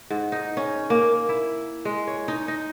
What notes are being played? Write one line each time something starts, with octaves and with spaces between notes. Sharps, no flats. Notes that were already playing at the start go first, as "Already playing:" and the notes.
G#2
D#4
C#4
A#3
E4
G#3
C#5
D#4
D#4